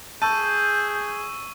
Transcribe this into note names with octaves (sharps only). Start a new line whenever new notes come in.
G#4 A5 C#6 E6 G6 D#7